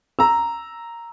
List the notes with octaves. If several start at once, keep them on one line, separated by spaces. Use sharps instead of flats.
A#5 E6